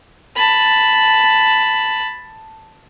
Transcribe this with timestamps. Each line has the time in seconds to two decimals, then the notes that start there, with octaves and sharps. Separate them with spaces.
0.36 A5 B5